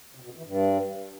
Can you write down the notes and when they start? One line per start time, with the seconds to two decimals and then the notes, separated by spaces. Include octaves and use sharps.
0.15 C3
0.22 B2
0.30 F#2
0.37 E3
0.44 G2